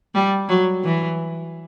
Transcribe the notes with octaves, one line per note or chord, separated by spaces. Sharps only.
G3
F#3
E3